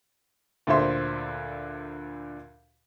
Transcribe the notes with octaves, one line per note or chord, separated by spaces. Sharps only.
D2 A#2 D3 C5 E5 C6